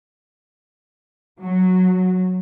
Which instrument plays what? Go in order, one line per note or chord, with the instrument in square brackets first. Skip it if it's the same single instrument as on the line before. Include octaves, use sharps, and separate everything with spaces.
[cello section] F#3